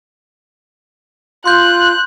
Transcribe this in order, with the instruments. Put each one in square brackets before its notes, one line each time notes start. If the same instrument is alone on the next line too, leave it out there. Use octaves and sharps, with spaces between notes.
[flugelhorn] F4 [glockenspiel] C6 G6 [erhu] F#6